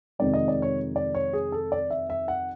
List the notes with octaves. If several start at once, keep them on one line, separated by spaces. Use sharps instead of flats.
F2 C3 D#3 G#3 D5
D#5
D5
C#5
D5
C#5
G#4
A4
D5
E5
E5
F#5